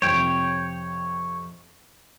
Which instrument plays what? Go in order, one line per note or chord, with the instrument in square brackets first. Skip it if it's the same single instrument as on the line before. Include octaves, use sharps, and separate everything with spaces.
[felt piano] F2 C3 F3 [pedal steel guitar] C#5 G5